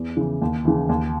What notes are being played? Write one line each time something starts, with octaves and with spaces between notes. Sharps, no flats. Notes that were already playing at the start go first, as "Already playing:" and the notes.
Already playing: E2
C#3 E3
D#2
C#3 E3
D#2